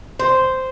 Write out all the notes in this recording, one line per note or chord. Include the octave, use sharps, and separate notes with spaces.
C5